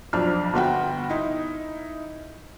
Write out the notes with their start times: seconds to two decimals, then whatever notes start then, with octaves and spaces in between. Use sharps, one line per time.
0.13 B1 F2 D4 F6
0.54 G1 B3 F#4 G5
1.09 D#4 E4